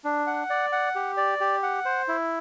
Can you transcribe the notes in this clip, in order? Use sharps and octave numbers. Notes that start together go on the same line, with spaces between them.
D4
F#5
D5
F#5
G4
D5
G4
F#5
C5
E4